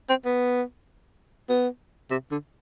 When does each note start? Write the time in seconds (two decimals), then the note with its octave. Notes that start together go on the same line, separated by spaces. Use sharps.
0.09 C4
0.25 B3
1.49 B3
2.10 C3
2.31 D3